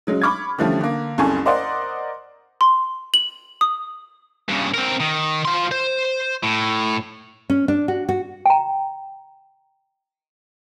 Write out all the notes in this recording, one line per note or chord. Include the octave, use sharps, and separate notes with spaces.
C#3 F#3 G#3
B5 C#6 D6 F6 G#6
D3 E3 F3 G3 A3 C#4
D3 A#3
F#1 C2 C#3 A4 G#5 C#6
A#4 C5 D5 D#5 F#5 C6
C6
F#7
D#6
G2 C#3
C4 A#4
D#3
F3 C6
C5
A2
C#4
D4
F#4
F#4
G5 A#5